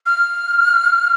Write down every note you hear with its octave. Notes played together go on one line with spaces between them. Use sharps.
F6